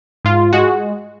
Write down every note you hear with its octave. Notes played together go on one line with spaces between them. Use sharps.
G#2 F4
G#3 F#4